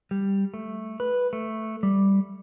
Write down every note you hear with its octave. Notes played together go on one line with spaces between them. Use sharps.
G3
A3
B4
A3
G3